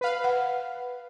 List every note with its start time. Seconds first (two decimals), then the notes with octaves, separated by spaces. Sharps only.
0.01 B4 F5
0.24 F#5